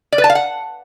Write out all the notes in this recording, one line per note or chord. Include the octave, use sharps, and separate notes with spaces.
D5
B4
A5
F5
F#5